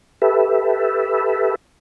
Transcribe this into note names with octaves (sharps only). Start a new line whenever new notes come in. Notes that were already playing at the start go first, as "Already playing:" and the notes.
G4 A4 B4 E5